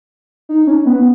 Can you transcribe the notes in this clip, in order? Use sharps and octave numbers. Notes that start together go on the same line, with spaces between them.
D#4
C#4
B3